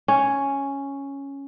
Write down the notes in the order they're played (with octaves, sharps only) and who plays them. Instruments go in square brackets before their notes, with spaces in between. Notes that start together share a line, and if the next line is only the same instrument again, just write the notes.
[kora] C#4